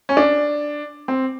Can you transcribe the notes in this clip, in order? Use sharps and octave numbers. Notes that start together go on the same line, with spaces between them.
C#4
D4
C4